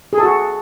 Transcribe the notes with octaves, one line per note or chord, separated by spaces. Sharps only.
G#4
A4
F#4